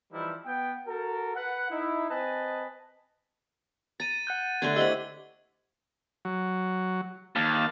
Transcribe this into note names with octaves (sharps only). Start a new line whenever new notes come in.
E3 F3 G3 D#4 E4
B3 G5
F#4 A4 A#4
B4 F#5
D#4 E4
C4 B4 D#5 G#5 A5
A#5 A6 D#7
F#5 F#6 G6
D3 A3 D4 G#6
E4 G4 C5 D#5 F#5 E6 G7
F#3
D#2 F5 A5